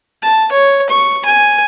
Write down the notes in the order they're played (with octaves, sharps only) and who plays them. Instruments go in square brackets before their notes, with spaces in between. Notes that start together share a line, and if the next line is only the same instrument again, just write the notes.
[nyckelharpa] A5
C#5
C#6
G#5